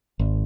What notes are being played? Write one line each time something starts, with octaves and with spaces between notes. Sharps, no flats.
G#1